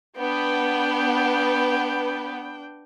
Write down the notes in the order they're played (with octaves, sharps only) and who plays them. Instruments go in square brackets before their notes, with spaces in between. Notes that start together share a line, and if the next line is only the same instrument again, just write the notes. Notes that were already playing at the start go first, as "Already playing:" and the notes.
[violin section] B3 [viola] D4 G5